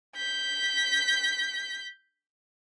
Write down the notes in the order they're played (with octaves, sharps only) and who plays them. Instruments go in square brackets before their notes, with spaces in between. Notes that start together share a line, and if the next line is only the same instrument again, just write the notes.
[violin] G6 B6